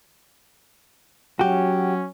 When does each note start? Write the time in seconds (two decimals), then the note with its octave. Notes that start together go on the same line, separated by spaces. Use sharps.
1.39 F#3 C#4 F#4 G4